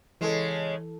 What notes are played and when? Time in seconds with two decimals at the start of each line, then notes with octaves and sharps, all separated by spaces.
0.21 C#3 E3 G#3 A4